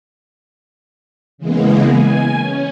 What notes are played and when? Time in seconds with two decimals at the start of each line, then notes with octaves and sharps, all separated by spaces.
1.38 C#3 E3 G#3 A#3 B3
1.88 G#5
2.37 C#4